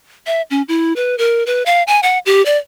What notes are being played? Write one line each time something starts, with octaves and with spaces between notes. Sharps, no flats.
E5
C#4
E4
B4
A#4
B4
F5
G#5
F#5
G4
D5